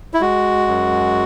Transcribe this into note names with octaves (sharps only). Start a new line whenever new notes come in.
E4
G#3 F#4
F#2